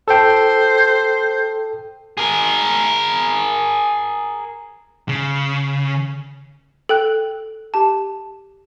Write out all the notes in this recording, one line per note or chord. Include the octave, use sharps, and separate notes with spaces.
A4 C5 G5
G#4 A#4
C#3
A4 G5 F#6
G4 A5